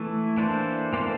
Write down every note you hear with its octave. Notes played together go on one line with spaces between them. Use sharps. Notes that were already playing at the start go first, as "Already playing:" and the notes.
Already playing: E3 A3 E4
E3 A#3 D4 A4 C5
E3 A#3 D4 A4 C5